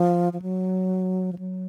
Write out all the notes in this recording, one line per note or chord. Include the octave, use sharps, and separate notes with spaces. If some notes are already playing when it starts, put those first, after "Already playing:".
Already playing: F3
F3
F#3
F3
F#3